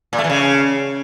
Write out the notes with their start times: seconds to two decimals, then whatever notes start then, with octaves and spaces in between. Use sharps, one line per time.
0.13 A#2
0.18 A3
0.24 E3
0.30 C#3